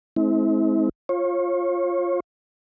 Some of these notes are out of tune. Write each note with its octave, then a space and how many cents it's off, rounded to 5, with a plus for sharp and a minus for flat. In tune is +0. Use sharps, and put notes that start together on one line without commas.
G#3 +40 C4 +0 E4 -45
F4 +0 C#5 -35